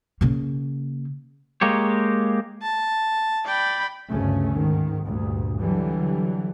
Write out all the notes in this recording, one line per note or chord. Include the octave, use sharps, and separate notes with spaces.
C#3 A#3
G#3 A#3 G4 C#5
A5
D5 G5 B5
G1 D2 G2 C#3 A3 C#4
G#2 D#3
D2 G2 A#2
D3 E3 F#3 G3